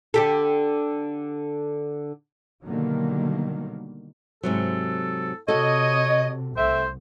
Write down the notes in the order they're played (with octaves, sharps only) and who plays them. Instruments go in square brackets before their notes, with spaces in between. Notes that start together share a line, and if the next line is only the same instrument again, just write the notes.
[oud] D3 G4 A4
[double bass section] B2 D3 D#3 F#3 G3 A#3
[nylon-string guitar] G#2 C3 F#3 [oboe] A4
[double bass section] C3 [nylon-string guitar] F#4 A4 [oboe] C#5 [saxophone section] D#5
[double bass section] C2 [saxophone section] A3 C4 E5 [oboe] C5